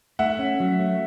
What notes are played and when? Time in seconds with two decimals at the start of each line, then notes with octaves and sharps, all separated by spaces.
0.19 A3 E5 F#5
0.39 C#4
0.60 F#3
0.79 A3